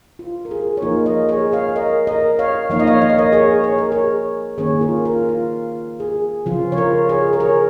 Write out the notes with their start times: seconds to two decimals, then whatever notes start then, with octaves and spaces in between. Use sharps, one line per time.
0.19 F4
0.45 A#4
0.51 G#4
0.77 C#5
0.82 F3 A#3 D#4 F4 A#4
1.06 A#4 D#5
1.29 G#4 C#5
1.53 C#5 F5
1.76 A#4 D#5
2.07 A#4 D#5
2.39 C#5 F5
2.70 F3 A#3 D#4 F5
2.79 D#5
2.87 C#5 F5
3.02 D#5
3.09 C#5
3.18 A#4 D#5
3.32 G#4 C#5
3.64 C#5
3.78 A#4
3.92 G#4 C#5
4.58 D#3 A#3 C#4 G#4 C#5
4.81 F4 A#4
5.05 F4 A#4
5.29 F4
6.00 G#4
6.46 C#3 F3 C#4 F4
6.72 C#5
6.77 F4 A#4
7.09 G#4 C#5
7.33 A#4
7.40 G#4 C#5